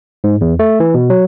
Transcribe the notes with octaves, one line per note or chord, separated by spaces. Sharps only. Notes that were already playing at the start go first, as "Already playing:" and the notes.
G#2
E2
A3
E3
B2
F#3